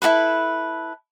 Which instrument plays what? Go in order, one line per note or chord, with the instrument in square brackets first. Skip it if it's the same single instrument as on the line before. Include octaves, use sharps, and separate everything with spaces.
[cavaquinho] E4 F#4 A4 B4